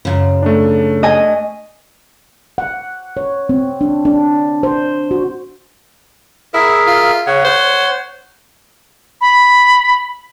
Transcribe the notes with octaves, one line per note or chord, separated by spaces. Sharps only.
F#2 A2 C#3
A3 D4
D#5 G#5
F#5
C#5
C4
D4
D4
C5
F#4
E4 G#4 A#4 E5
F4
C#3 C#5 F#5
C5
B5